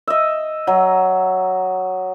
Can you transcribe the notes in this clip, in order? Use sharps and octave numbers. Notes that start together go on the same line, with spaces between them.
D#5 E5
F#3